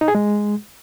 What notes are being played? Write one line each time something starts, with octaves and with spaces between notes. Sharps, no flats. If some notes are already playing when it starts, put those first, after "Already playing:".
D#4
G#4
G#3